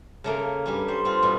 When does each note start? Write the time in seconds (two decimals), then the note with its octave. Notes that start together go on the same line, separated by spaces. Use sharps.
0.24 C#3 A3 A#3
0.66 G2 G3 C#4
0.88 G3 C5
1.05 C4 F4
1.23 B2 G3